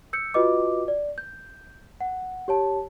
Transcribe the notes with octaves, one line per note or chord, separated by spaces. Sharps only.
E6 G6 C#7
F4 F#4 B4 D#5 D6
D5
G6
F#5
G4 C#5 A5